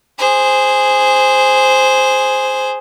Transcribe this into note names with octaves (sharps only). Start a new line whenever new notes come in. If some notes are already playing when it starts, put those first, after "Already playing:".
G#4 C5